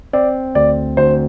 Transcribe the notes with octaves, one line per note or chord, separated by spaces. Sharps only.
C4 D5
D2 D5
D2 C5